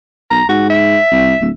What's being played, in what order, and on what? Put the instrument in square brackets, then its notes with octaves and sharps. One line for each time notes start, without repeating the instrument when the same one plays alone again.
[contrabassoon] B1 [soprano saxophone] A#5
[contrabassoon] G#2 [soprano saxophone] F#4
[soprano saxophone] E5
[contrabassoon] C2
D1